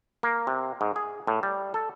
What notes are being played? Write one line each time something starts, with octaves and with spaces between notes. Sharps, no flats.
A#3
C3
G#2
G#4
A2
G3
A4